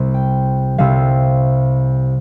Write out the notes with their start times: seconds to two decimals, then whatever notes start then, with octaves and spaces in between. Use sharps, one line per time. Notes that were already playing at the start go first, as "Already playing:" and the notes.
Already playing: C2 C3 G3
0.14 G5
0.78 C2 C3 G3 F5